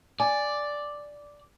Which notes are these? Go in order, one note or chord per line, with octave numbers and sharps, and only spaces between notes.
D5 F#5 G#5